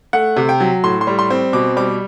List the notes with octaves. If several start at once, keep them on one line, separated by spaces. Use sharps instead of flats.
A3 F#5
C3
G5
F#3
A2 C6
C6
G3
C6
C4
B2 D6
G3 D6